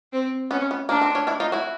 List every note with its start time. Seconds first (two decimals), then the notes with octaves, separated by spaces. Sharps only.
0.13 C4
0.51 B3 C#4
0.71 B3
0.89 A#3 D4
1.01 C4
1.15 C#4
1.27 D4 E4
1.40 D#4 F4
1.52 E4 F#4